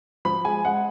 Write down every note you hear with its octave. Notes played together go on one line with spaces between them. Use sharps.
F3 B5
G#3 G#5
G#3 F#5